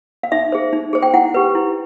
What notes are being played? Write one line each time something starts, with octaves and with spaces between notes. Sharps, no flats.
F5
D#4 E5
G#4 C5
D#4
G#4 C5
G5
E4 F#5
G4 B4
E4